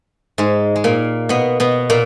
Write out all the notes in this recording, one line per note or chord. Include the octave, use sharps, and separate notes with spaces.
G#2 G#3
G#3
A#2 A#3
B2 B3
B2 B3
A#2 A#3